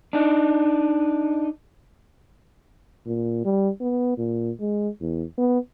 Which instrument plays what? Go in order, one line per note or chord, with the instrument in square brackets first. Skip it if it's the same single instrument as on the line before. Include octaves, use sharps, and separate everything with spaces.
[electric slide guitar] D4 D#4
[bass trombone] A#2
G3
B3
A#2
G#3
E2
B3